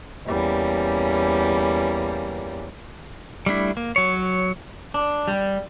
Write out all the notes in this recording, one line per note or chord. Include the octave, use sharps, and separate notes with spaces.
E2 G3 A#3 C#4
G3 A3 D4 E4
A#3
F#3 C#5
D4
G3